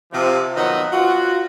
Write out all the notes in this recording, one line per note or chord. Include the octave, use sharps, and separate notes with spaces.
C3 F3
D#3 F3 F#3 B3 D#5
F4 F#4